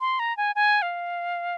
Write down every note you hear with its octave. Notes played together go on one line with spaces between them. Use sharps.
C6
A#5
G#5
G#5
F5